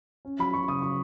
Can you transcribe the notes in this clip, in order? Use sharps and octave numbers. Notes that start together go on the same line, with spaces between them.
C#4
F#3 B5
F#3 C#6
C#3 D#6
F#3 C#6